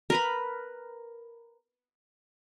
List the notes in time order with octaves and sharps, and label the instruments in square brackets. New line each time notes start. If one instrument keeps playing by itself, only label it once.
[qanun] A#4 B4 B5